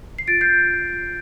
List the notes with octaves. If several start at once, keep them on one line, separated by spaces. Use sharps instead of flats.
C7
F4 A6 D7
G6 C7